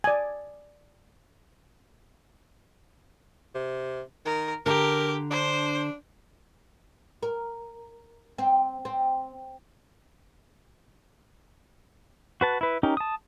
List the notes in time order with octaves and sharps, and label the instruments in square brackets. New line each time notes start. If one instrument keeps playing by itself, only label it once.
[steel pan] D5 G#5
[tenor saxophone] C3
[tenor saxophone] D#3 [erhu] A#4
[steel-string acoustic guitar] D3 A#5 [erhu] G4 [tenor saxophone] A#4
[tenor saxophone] D4 [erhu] C5
[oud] A#4
C4
C4
[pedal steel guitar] F#4 B4 A5
E4 B4
C#4 D#4 G4 A#4
A5 D#6